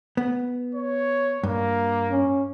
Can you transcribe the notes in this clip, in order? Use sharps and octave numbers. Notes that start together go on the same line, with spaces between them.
B3
C#5
G2 A#3
C#4